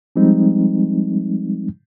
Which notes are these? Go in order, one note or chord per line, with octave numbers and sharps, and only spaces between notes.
F3 G3 G#3 C4 D#4